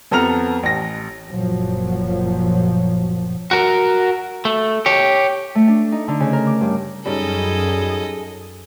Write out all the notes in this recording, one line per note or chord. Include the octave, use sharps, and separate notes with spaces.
F2 B3 A4 A#5 F6 F7
A1 A#6
F#1 A#2 F3 F#3
F#4 A#4
A3
G4 C#5
A3
D4
D#4
D3
C#3
A#4
D6
G2
F#2 G3 C#4 D#4 G#4 A4 D#5